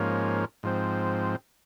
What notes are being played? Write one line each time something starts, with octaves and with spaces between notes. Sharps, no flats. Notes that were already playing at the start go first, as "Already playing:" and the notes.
Already playing: G#2 F3 A#3 C#4
G#2 F3 C4